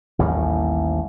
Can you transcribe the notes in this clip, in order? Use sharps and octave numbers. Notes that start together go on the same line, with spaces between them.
A1 D#2 A2 G3